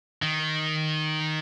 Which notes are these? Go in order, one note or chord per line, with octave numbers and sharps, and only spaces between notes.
D#3